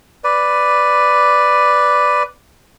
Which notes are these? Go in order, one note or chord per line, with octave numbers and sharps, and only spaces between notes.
B4 D5